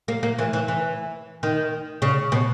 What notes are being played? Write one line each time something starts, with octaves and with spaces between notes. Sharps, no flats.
A#3
A#3
E3
E3
E3
D#3
C#3
B2